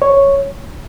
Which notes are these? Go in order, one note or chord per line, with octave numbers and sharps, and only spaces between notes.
C#5